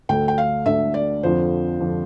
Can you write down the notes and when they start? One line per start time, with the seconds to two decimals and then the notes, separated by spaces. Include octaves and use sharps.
0.09 D2 D3 A3 G5
0.28 G5
0.38 F5
0.66 D2 D3 A3 E5
0.94 D5
1.23 F2 D3 F3 C5
1.80 F2 D3 F3